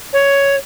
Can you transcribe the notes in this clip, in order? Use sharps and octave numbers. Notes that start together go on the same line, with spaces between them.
C#5